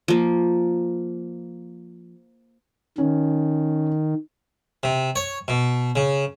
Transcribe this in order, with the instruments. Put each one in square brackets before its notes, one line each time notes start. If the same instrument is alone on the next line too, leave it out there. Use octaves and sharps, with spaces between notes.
[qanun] F3 A#3
[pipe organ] D#3 [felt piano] C#4
[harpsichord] C3
C#5
B2
C#3